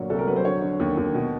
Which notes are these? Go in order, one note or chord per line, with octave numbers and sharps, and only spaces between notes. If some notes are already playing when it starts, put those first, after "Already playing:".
Already playing: G1 A#2 F#3 C#5
C2 A4
A#4
F#3 B4
C5
D3 C#5
D3
D#2
D#2
B2